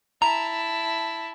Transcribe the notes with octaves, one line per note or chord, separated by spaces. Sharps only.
E4 A5 A#5